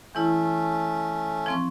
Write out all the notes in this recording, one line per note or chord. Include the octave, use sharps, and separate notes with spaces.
E3 A3 C#4 E4
F3 C4 C#6